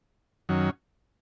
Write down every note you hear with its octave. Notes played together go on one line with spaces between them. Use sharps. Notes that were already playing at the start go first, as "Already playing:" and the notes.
F#2 D#3 F#3 C#4